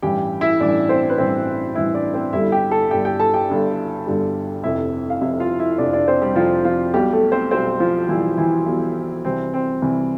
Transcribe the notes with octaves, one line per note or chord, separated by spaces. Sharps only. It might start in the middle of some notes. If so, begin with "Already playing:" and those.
A1 G2 E3 G4 G5
E4 E5
A1 G2 E3 D4 D5
C4 C5
B4
A1 G2 E3 C4 C5
A1 G2 E3 E4 E5
D4 D5
C4 C5
G1 G2 D3 G3 E4 E5
G4 G5
A4 A5
G1 G2 D3 G3 G4 G5
G4 G5
A4 A5
G4 G5
G1 G2 D3 G3
G1 G2 D3 G3
F1 F2 C3 E4 E5
F5
F1 F2 C3 E4 E5
F4 F5
E4 E5
F1 F2 C3 D4 D5
D4 D5
C4 C5
G3 G4
F1 F2 C3 F3 F4
F3 F4
B1 B2 G3 G4
A3 A4
C4 C5
B1 B2 G3 C4 C5
F3 F4
B1 B2 E3 G3 E4
E3 E4
B1 B2 G3
C2 C3 E3 C4
C4
C2 C3 E3